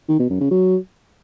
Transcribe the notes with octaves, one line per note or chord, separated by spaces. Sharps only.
D#3
B2
F#2
C#3
F#3